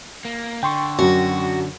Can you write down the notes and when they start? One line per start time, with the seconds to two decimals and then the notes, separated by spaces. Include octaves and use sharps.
0.25 A#3
0.63 D3 G5 C6 C#6
0.99 F#2 F#3 F#4